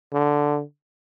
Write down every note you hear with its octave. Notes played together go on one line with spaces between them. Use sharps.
D3